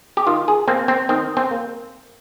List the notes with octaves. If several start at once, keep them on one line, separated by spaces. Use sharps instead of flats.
G4
D#3 F4
G#4
A#3 C4
C4
D#3 C4
C4
A#3